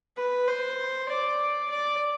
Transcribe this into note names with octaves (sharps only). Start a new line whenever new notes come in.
B4
C5
D5
D5